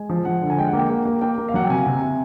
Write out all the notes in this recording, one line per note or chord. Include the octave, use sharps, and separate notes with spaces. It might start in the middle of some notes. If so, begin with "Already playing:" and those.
Already playing: G#3 G#5
F3
F3 F#5
D3
G#5
G#3 G5
F#5
A#3 G5
A#3
A#3
A#3 G5
A#3
F5
F#3 F#5
G5
C3 G#5
C3
C3